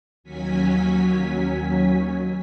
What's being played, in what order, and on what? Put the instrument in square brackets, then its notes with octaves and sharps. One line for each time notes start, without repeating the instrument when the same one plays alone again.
[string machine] D#2 F#3 C#4 G#5 B6